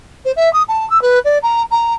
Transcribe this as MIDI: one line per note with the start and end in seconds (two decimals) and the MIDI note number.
0.25 0.32 72
0.36 0.51 76
0.53 0.63 87
0.68 0.88 81
0.90 1.01 88
1.02 1.19 71
1.24 1.38 74
1.42 1.63 82
1.71 1.94 82